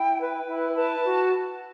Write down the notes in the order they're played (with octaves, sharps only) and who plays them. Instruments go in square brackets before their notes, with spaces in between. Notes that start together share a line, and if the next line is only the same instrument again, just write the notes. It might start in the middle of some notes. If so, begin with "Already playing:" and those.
Already playing: [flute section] E4 G5
B4
E4
B4 A5
F#4